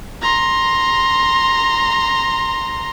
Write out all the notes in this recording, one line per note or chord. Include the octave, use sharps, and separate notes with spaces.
A#5 C6